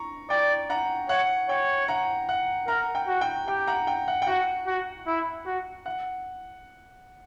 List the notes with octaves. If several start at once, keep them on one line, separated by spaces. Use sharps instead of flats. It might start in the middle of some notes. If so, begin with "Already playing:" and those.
Already playing: A#5 C#6
D5 G5
F#5 A#5
C#5 F#5
C#5 G5
F#5 A#5
F#5
A#4 F#5 A#5
G5
F#4
G5
G4 G5
F#5 A#5
G5
F#5
G5
F#4 F#5
F#4
E4
F#4
F#5